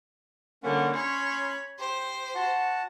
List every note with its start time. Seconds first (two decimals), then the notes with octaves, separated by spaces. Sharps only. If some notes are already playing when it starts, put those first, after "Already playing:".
0.63 D3 G3 A#3 C#4 F#5
0.94 C#4 C#5 B5 C6
1.79 G4 C5
2.35 F#4 F#5 A5